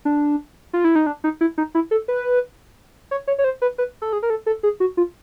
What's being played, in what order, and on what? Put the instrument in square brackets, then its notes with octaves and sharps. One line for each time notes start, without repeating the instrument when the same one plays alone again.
[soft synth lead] D4
F4
E4
D#4
D4
D#4
E4
D#4
E4
A4
B4
C#5
C#5
C#5
C5
B4
B4
A4
G#4
A#4
A4
A4
G#4
F#4
F4